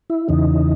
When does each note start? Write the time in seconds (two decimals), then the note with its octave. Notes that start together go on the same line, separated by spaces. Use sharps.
0.10 E4
0.29 E2 C#3 E3 D#4